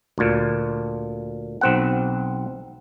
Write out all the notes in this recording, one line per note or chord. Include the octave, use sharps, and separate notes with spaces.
D2 A#2
B1 C4 F#5